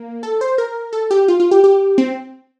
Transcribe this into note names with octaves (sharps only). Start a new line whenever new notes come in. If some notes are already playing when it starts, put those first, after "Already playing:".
Already playing: A#3
A4
C5
A#4
A4
G4
F4
F4
G4
G4
C4